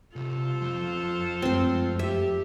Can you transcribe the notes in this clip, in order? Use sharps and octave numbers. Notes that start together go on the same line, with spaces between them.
C2 F4 A4 C5
F2
F#2 G#3 A3 C4 C6
G4 E5